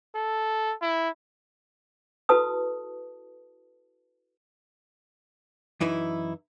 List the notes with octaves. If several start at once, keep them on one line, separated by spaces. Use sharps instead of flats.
A4
E4
E4 F#4 A4 B4 A5 D#6
F#2 E3 D#4 E4